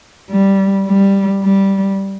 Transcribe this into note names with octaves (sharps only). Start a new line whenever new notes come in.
G3
G3
G3